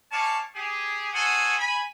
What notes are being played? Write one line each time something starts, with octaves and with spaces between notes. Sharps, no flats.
C#4 C#5 D5 F5 A5 C#6
G4 G#4
F#4 G#4 A4 C5 F#5 G#5
G#5 B5